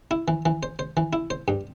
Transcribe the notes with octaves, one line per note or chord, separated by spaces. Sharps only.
E4
E3
E3
C5
C5
E3
E4
C5
G2